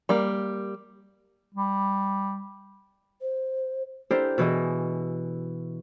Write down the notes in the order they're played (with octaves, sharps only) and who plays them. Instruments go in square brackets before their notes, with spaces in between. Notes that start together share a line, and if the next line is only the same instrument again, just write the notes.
[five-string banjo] G3 A#3
[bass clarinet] G3
[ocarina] C5
[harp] D4 E4 G4 A4 A#4 C5
B2 E3 G#4 D#5